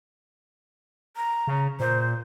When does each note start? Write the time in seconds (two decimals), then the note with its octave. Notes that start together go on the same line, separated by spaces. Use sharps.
1.17 A#5
1.47 C#3
1.80 A#2 C5